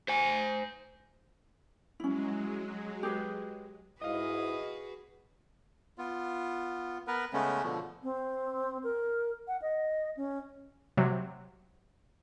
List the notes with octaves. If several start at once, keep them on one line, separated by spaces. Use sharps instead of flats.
C5 G#5
F#3 G#3 C#4 E4
G4 G#4 B4
G#2 E4 F#4 G#4 B4 D#5 F5 D#6
B3 F4
B3 A#4 B4
C#3 G#3 A3 B3 C#4
B2 D3 F3
C4
A#4
F#5
D#5
C#4
C3 F#3